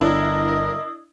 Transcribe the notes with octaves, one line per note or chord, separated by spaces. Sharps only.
G1 D4 E4 A#4 D#5 D#6